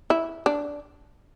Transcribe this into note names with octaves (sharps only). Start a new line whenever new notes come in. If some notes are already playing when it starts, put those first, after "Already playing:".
E4
D4